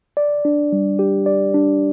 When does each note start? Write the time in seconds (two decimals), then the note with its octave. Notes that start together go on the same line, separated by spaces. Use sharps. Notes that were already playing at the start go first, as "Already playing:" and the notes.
0.17 D5
0.45 D4
0.72 G3
0.99 G4
1.26 D5
1.54 D4